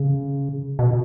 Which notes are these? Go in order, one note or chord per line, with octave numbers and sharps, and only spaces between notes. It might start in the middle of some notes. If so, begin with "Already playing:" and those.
Already playing: C#3
B2